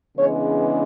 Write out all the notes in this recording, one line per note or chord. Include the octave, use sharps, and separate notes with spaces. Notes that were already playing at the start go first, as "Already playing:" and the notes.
C#3 E3 G#3 B3 D4 C#5